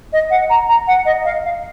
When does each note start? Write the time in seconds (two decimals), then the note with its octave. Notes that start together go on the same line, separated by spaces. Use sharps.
0.13 D#5
0.30 F#5
0.50 A#5
0.68 A#5
0.87 F#5
1.05 D#5
1.25 F5
1.44 F5